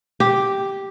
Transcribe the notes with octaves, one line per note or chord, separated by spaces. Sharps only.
G4